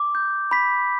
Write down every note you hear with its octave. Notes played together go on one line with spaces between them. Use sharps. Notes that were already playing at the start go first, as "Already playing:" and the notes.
Already playing: D6
G6
B5 B6